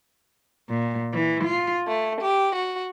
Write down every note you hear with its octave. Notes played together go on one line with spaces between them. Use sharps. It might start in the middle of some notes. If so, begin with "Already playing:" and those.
A#2
E3
F4
A3
G4
F#4